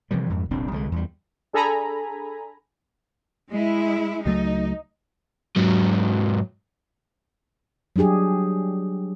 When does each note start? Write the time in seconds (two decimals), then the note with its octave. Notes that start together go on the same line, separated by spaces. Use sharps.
0.11 C3 E3 F3 G3
0.30 F2 G#2
0.50 D#1 C2 C4 D4
0.71 C2 D3 F#3 G#3
0.92 E2 G3
1.53 D4 G#4 A4 G#5 A#5 B5
3.51 G#3 E4
4.26 C#2 F#3 A3 D#4
5.56 G#2 F#3
7.96 F#3 G3 D4 G4 G#4